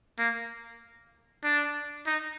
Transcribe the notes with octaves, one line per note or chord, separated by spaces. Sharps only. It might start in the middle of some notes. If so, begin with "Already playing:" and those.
A#3
D4
D#4